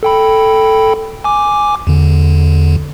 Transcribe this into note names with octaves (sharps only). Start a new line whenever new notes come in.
A4 G5 B5
G#5 D6
E2 D3